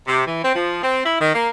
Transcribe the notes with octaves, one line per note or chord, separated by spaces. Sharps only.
C3
E3
C4
F3
C4
E4
D#3
A#3